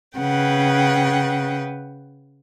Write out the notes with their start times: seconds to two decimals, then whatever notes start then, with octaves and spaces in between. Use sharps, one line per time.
0.18 C#3 B4 F#5 G5